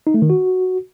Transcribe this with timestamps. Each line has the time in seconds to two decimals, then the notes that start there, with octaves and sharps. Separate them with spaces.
0.07 D#4
0.14 A3
0.22 D#3
0.30 F#4